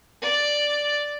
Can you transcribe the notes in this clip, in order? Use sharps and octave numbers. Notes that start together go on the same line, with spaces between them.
D5